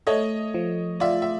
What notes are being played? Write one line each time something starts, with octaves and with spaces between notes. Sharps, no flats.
A3 C#5 D#5
F3
F4 D5 E5
E5